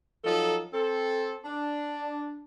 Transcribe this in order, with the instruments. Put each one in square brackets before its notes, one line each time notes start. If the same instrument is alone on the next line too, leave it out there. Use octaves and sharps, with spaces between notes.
[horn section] F3 F#3 D#4 A4
C4 A4
D4